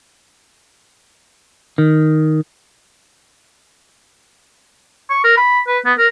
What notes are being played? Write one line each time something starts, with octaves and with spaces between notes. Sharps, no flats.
D#3
C#6
A#4
B5
B4
B3
A#4